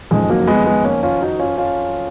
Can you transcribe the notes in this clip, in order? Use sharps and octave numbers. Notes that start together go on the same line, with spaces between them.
F#1 F2 D#3 G#3
F#3 A#3
G#3 B3
G#3 B3
A#3 C#4
C#4 F4
D#4 F#4
C#4 F4
C#4 F4